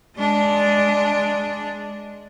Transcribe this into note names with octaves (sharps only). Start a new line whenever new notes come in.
G#3 D4